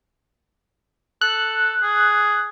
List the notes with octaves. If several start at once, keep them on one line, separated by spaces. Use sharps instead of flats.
A4 F#6
G#4